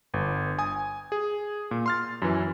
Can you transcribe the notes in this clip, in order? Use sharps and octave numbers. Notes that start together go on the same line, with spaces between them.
G1
G#5 D#6
G#4
A#2
C6 F6 A6
F#2 E3